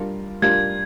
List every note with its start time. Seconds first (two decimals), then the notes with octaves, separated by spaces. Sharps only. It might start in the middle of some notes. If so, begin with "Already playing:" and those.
Already playing: G3 D4 F4 A#4
0.42 G3 D4 F4 A#4 G#6